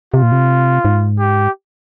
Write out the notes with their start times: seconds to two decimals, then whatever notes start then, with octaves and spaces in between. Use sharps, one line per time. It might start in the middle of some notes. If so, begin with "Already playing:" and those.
0.14 C3 F4
0.23 A#2
0.32 C3
0.85 G#2
1.19 G4